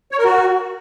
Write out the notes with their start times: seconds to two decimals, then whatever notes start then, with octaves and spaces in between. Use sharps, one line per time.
0.12 C#5
0.18 A#4
0.25 F#4